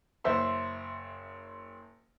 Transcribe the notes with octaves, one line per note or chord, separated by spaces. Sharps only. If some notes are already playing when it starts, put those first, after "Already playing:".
F#1 C5 E5 C6